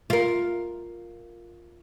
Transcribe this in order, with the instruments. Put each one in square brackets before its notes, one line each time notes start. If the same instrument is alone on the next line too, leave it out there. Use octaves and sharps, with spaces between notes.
[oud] F4 A#4